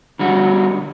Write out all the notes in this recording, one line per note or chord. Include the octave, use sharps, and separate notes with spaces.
D3 G3 F#4